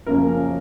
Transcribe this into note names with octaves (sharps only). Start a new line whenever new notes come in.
F#2 C#3 F3 A#3 C#4 A#4